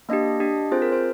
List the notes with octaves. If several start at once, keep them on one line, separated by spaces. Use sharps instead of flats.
A#3 D4 G4 D#5
D4 G4
C4 F4 G#4 C5
A#4
C5